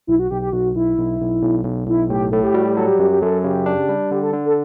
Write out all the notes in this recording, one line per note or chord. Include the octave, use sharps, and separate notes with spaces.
B1 E4
F#4
B1 G4
G4
B1 F#4
B1 E4
B1
B1
B1
B1
B1 E4
A2 G4
A2 A4
G4
G3 F#4
G4
F#3 A4
G4
F#2 G4
G4
F#2 A4
C#3 G4
D4
G3
D3 G4
A4
D3
A4